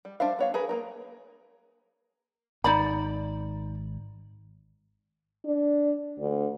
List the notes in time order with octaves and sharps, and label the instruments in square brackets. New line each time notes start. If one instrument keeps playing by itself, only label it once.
[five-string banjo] G3
G3 D4 C5 E5 F5
B3 C#5 F5
G#4 A#4 B4
A#3 C4 A#4
[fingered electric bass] G#1 [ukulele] D#4 D5 B5
[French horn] D4
D2